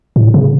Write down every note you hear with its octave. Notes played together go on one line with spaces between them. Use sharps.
A2
C#3